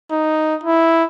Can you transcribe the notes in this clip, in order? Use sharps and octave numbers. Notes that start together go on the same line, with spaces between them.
D#4
E4